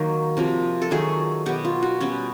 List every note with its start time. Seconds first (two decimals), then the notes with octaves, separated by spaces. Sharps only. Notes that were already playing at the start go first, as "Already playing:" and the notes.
Already playing: D#3 F#3 A#3
0.37 C3 F3 A#3
0.82 A4
0.91 D#3 F#3 A3 G#4
1.46 B2 F#3 B3 G4
1.65 F4
1.82 F#4
2.00 B2 G3 B3 C#4